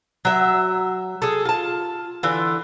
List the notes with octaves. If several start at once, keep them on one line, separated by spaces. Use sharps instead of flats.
F#3 E5
G#4 A4
F4 A5
D3 E3 F4